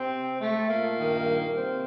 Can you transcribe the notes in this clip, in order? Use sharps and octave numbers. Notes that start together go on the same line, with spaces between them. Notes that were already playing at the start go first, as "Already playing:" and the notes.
Already playing: C3 C4
A3
A#2 A#3
G2 D#3
C3 C4